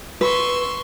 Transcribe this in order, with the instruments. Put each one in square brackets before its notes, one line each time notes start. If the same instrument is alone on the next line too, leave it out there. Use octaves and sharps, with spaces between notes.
[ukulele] B4 [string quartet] C6 C#6 E6